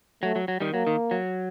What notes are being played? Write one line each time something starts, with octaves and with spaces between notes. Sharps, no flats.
F#3 A3
F#3
F#3
D#3 G3
F#3 A#3
D#3
F#3